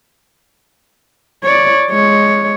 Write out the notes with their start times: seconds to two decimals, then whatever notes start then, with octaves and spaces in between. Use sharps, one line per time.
1.44 C#5 D5
1.90 G#3 C#5